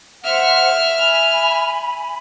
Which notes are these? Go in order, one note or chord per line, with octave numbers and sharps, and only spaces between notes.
C5 E5 F#5 F6
G#5 B5